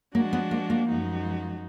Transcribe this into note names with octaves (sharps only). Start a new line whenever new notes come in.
F3 G#3 A#3 D4 F#4
B3
A#3
A#3
F#2 F3 G#3 D#4 F#4